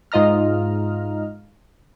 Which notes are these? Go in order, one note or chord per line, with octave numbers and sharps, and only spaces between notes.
G#2 F4 D#5 A#5 F6